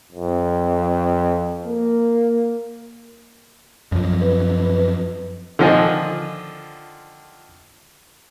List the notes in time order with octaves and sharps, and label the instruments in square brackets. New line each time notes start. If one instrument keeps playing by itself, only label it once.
[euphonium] F2
A#3
[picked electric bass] F#2 F3
[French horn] B4
B4
[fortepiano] D3 D#3 F3 F4 D#5 G#5